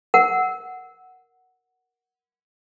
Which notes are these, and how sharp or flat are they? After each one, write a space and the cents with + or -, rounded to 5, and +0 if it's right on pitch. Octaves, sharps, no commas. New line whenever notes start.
A#4 +0 F#5 +0